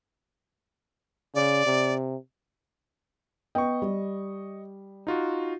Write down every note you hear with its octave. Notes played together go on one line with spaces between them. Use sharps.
C#3 D5
C3
B3 D#5 G5 C#6
G3
D#4 F4 F#4